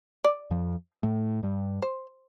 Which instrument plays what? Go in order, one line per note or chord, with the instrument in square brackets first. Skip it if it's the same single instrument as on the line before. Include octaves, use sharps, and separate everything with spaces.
[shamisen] D5
[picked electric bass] F2 F3
A2 A3
G2 G3
[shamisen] C5